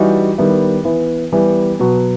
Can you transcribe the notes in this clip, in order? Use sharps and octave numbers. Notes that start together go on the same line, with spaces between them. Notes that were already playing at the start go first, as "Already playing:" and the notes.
Already playing: E3 G3 D#4 F#4
D#3 G3 B3 E4
E3 B3 E4
E3 G3 B3
B2 F#3 B3 F#4